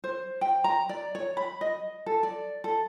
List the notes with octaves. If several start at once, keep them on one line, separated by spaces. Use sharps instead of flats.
C5
G5
A#5
D5
C#5
B5
D#5
A4
D5
A4